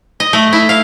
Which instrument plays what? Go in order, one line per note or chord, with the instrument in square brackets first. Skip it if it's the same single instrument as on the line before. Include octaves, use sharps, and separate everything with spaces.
[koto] D#5
A3
E4
F5